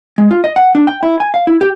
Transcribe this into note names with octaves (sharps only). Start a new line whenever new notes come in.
G#3
F4
D#5
F#5
D4
G5
E4
G#5
F5
E4
G4